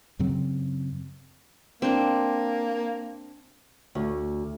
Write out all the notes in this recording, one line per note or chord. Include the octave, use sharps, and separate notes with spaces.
F#2 C#3 F#3 C4
A#3 C4 D4
D2